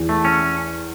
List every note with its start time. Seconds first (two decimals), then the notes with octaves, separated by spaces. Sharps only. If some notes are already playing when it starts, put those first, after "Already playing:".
Already playing: E2 E3
0.09 A3
0.25 C#4